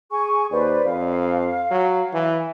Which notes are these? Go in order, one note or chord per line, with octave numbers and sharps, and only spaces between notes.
G#4 G#5 C#6
D#2 B4 C5 D5
F2 F5
F#3
E3